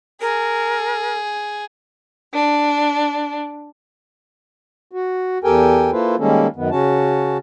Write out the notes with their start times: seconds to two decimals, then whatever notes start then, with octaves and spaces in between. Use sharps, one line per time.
0.21 G#4 A#4
2.33 D4
4.92 F#4
5.44 E2 G4 A4 A#4 G5 G#5
5.92 A#3 E4 F4 A4 B4 C5
6.19 D#3 G3 G#3 A#3 C#4 A4
6.56 F#2 D#3 B3
6.71 C#3 C#4 F#4 A5